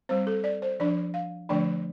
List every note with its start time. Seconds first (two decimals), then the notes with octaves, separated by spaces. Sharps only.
0.09 G3 C4 C5
0.27 A4
0.44 D5
0.62 C5
0.80 F3 D4 D5
1.14 F5
1.49 D3 F3 A3 D4 D5